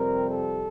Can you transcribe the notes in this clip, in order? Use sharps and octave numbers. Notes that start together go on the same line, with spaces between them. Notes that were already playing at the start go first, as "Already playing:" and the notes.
Already playing: F2 C3 G3 C4 A#4
A4